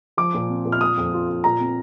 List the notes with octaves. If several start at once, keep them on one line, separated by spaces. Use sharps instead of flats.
F3 D6
A#2
C4
A#2
F6
F4 D#6
F2
F4
F4
A#2 A#5
C4